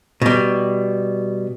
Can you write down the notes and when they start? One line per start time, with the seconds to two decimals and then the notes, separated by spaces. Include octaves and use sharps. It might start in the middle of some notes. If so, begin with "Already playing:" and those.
0.22 B2 G3